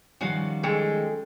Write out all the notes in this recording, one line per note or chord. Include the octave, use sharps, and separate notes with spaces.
D#3 F3 G3 C#4 F#4 F5
G#3 C#4 A4 G5